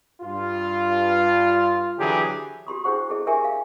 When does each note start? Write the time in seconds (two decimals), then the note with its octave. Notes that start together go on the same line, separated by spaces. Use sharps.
0.22 G2 F4
1.98 D3 E3 F#3 G4 G#4
2.67 F#4 G4 C6 D#6
2.84 D4 E4 G#4 C5 F#5 C#6
3.09 E4 G#4 A4 D#5
3.27 D4 G4 A#4 E5 G5 G#5
3.44 F5